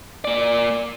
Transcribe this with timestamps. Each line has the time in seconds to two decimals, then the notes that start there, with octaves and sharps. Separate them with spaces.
0.25 A#3 D5